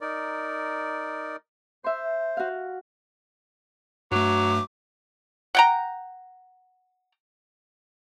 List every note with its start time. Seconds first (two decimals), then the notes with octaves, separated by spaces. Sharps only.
0.01 D#4 A#4 D5
1.84 C5 E5 C6
2.37 F#4 F5
4.12 G2 F#3 A3 D6
5.55 F#5 G5 A#5